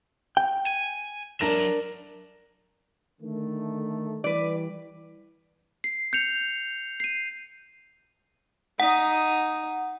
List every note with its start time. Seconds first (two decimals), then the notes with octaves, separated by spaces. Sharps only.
0.37 G5
0.67 G#5
1.41 F#3 D4 A#4 E5 A#6
3.21 D3 D#3 A3
4.24 E3 G3 B4 D5
5.84 C7
6.13 G6 C#7 F7
7.00 C7 D#7
8.80 D#4 D#5 F#5